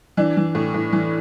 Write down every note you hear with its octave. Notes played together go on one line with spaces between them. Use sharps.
E3 D4
E3
A2
A2
E3